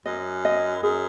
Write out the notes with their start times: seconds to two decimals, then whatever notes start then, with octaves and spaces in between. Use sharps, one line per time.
0.06 F#2 D#5
0.45 D#5
0.83 F#2 G#4